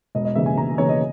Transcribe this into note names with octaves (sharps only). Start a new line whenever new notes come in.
E1 D#5
D#5
D#2 C#3 E3 E5
G#5
E1 A#5
D#2 C#3 E3 C#5
D#5